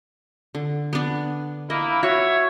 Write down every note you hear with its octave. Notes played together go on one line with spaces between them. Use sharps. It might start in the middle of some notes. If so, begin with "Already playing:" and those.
D3
B3 D4
A#3 E4 D#5
F#4 C#5 E5